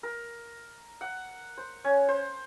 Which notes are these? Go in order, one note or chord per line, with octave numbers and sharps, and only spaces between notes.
A#4
F#5
C5
C#4
C5